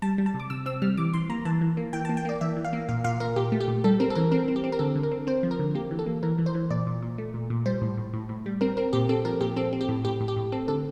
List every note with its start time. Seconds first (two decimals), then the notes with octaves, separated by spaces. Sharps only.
0.02 G3 A5
0.18 G3
0.26 A5
0.34 C3
0.40 D6
0.50 C3 E6
0.66 C4 E6
0.82 G3 F6
0.97 E3 D6
1.13 E3 C6
1.29 A#3 A#5
1.45 E3 A5
1.61 E3
1.77 A#3
1.93 E3 G5
2.05 A5
2.09 A#3
2.17 G5
2.25 A#3 D5
2.41 E3 E5
2.57 E3
2.65 F5
2.73 A#3
2.89 A#2 F5
3.04 A#2 F5
3.20 A#2 A#4
3.36 A#2 G4
3.52 A3
3.60 G4
3.68 A#2
3.84 G3 A4
4.00 C4 A#4
4.10 A4
4.15 E3 A#4
4.32 C4 A#4
4.48 C4
4.56 G4
4.64 C4
4.72 A#4
4.79 D3 A4
4.95 D3
5.03 A#4
5.11 C4
5.27 C4 C5
5.43 F3
5.51 A#4
5.59 D3
5.75 A#3 G4
5.91 E3
5.99 A4
6.06 A#3
6.23 E3 A#4
6.38 E3
6.46 C5
6.55 E3
6.70 A#2 D5
6.86 A#2
7.03 A#2
7.18 A3
7.34 A#2
7.50 A#2
7.66 G3 C5
7.81 A2
7.97 A2
8.14 A2
8.29 A2
8.46 G3
8.61 C4 A#4
8.77 C4 A#4
8.93 A#2 G4
9.09 C4 A4
9.25 F3 A#4
9.41 A#2 G4
9.56 C4 A4
9.73 C4
9.81 G4
9.89 A2
10.04 A2 G4
10.20 A2
10.28 G4
10.36 A2
10.52 C4 A4
10.68 D3 A4